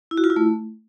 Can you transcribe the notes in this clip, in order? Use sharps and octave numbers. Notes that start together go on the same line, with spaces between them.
E4
F#4
F4
E4
A3